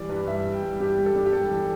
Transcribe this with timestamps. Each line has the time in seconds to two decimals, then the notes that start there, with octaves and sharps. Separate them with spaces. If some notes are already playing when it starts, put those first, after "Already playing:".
Already playing: E3 G3 D5
0.09 G2 B4
0.27 G3 E5
0.45 G2
0.53 G5
0.63 G3
0.80 D4 G4
0.98 G3
1.06 A4
1.16 D4
1.26 G4
1.33 G3 A4
1.51 E3